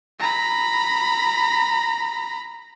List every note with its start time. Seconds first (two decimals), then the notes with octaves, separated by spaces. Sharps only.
0.20 A#5 B5